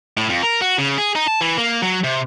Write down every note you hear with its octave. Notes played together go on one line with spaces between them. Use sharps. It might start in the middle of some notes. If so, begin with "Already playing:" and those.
A2
F2
A#4
F#4
C#3
G#4
D#4
A5
E3
A#3
F#3
C3